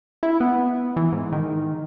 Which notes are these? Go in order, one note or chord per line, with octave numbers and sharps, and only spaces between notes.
E4
B3
E3
G#2
D#3